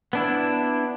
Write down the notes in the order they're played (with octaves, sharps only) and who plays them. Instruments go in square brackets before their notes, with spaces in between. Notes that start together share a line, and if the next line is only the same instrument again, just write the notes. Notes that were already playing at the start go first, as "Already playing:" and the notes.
[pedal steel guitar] B3 D4 E4